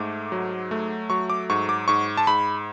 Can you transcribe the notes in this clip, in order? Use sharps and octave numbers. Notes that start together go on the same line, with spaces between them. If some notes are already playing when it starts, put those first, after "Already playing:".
Already playing: G#2 A3 D6
F#3
A3
F#3 C#6
D6
G#2 C#6
D6
G#2 C#6
A5
G#2 B5